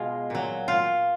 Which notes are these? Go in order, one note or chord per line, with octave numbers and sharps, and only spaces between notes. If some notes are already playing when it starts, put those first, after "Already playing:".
Already playing: B2 G#3 F4
A#2 F#3
F4